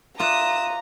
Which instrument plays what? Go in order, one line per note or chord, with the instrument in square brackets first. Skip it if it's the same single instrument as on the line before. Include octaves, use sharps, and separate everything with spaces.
[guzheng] F4 D5 E5 [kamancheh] A#5 [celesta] C6 F#6 [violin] D#6 E7